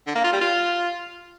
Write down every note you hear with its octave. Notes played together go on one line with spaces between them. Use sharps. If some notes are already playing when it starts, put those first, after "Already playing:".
D3
A#3
F4
G3
F4